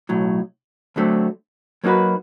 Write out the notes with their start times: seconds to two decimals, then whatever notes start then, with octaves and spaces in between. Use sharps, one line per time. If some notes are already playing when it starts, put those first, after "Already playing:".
0.09 B1 A2 F#3
0.96 D2 D3 F#3 A3 C4
1.84 F#3 A#3 D#4 F#4 B4